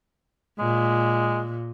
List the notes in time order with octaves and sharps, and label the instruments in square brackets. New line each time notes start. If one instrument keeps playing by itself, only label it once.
[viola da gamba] A#2 [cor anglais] G#3